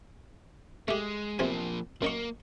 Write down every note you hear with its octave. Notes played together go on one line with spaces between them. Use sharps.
G#3 A3 G4
B1 C3 F3 A#3 G#5
F#2 A#3 D#4 C#6